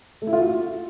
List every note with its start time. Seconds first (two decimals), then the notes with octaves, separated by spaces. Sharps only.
0.22 A3
0.27 E4
0.33 F4
0.38 F#4